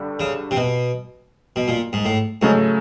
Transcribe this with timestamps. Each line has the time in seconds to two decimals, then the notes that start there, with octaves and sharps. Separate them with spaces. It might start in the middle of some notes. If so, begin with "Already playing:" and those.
Already playing: G2 D3 G3
0.20 C#3
0.51 C3
0.56 B2
1.56 B2
1.68 A#2
1.93 G#2
2.05 A2
2.42 G#2 C#3 F#3 A3